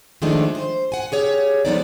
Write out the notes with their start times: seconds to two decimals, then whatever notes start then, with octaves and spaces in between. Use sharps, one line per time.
0.22 D#3 F3 G#3 A3 D4 D#4
0.55 C5
0.92 F#5 G#5
1.12 G4 G#4 C#5
1.65 F3 G#3 B3 D#4 A4 D5